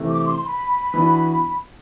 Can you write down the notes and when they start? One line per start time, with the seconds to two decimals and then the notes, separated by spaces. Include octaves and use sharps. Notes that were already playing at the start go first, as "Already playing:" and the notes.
Already playing: C3 E3 A3
0.09 D6
0.22 D6
0.26 C6
0.37 C6
0.44 B5
0.94 E3 B3 D4 F#4